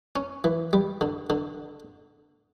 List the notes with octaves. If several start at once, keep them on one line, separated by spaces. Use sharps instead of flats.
C#4
E3
G3
D3
D3